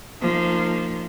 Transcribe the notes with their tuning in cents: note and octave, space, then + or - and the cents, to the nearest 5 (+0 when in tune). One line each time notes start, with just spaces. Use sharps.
F3 -15 A#3 -40 D#4 -35